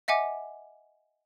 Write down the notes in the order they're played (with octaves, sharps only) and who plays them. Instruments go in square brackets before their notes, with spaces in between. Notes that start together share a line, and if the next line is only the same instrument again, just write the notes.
[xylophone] D#5 E5 F#5 G#5 D6